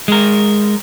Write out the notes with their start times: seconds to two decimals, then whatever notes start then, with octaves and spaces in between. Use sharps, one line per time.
0.08 G#3 A#4